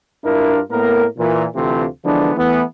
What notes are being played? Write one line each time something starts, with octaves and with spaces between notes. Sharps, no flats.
G2 D4 E4 F4 A#4
A2 A#3 B3 A#4
A#2 E3
D2 C3 E3 A3 C4 F4
D3 E3 F3 G#3 B3 D4
E3 A3 B3